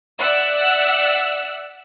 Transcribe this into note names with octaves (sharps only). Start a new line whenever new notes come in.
D5 E5 F#5 E6 F#6